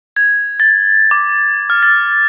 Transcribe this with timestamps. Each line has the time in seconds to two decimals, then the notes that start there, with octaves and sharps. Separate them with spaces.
0.16 G#6
0.60 A6
1.11 D6
1.70 F6
1.83 A6